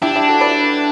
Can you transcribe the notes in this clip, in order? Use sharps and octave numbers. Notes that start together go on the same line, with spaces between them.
D4 E4 G4
E4 G4
F#4 A4
B4 D5